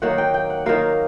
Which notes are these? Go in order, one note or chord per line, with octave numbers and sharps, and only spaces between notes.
D#3 F#3 A#3 F#5
G5
G5
F#5
D#3 F#3 A#3 F5